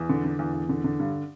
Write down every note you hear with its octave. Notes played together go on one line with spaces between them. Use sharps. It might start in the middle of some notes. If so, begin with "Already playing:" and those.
Already playing: E2
D3
D3
E2
E2
D3
D3
G2